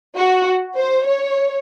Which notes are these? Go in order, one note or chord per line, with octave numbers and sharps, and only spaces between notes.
F#4
C5
C#5